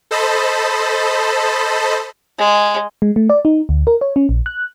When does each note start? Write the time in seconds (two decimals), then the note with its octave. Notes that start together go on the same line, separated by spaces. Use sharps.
0.11 A4 C5 D#5 A5 B5
2.38 G#3
3.02 G#3
3.16 A3
3.30 D5
3.45 D#4
3.69 D2
3.87 A#4
4.01 C#5
4.16 C#4
4.29 A#1
4.46 F#6